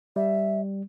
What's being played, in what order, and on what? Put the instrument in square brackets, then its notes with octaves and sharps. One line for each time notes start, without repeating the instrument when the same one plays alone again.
[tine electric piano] G3 [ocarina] E5